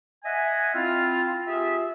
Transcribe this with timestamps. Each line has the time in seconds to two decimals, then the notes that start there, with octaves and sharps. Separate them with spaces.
0.24 D#5 E5 F#5 G#5
0.74 C4 E4 F4
1.46 F4 G4 G#4 E5